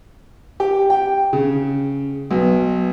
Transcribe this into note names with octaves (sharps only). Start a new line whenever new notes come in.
G4
G5
C#3
B1